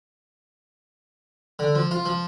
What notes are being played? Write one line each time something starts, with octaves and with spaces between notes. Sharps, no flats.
D3
F3
F4
F3